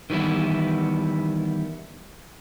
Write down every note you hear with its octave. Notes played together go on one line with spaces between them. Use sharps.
D#3 E3 G3 B3 E4